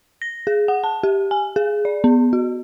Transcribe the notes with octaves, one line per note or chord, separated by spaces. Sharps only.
A#6
G#4
F#5
A5
G4
G#5
G#4
D5
B3
F#4